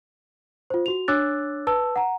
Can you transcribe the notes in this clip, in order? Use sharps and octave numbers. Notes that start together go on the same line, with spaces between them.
F4 C5
F#4 F7
D4 C#5 D6 E6 F#6 A6
B4 A5 E6
F#5 A#5